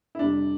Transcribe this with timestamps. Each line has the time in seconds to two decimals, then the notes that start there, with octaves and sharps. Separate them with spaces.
0.15 E4
0.19 F2 C3 G3 D4